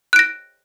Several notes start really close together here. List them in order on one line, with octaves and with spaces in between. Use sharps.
F#6 D7 A#6